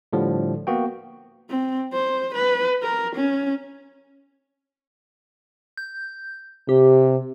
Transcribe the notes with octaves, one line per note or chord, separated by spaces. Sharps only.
A2 D3 F3 G3
A#3 B3 F#4 G5
C4
C5
B4
A#4
C#4
G6
C3 G4